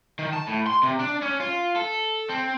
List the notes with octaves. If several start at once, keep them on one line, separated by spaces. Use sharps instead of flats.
D#3
A5
A2
C6
C3
D4
C#4
F4
A4
C4